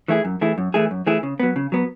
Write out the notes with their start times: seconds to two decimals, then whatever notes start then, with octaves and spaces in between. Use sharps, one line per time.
0.08 E3 A3 E4 G#4
0.25 F#2
0.41 E3 A3 E4 G#4
0.58 F#2
0.74 E3 A3 E4 G#4
0.91 F#2
1.07 E3 A3 E4 G#4
1.23 C#3
1.40 F#3 B3
1.56 C#3
1.72 F#3 B3